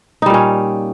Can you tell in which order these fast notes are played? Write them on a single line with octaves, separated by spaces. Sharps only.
D#4 G3 A#2 C#4